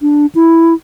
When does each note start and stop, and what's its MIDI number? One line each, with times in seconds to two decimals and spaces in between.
0.01 0.26 62
0.35 0.74 64